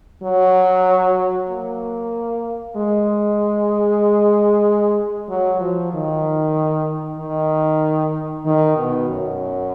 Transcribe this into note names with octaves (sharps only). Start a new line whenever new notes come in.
F#3
A#3
G#3
F#3
F3
D#3
D#3
D#3
B2
F#2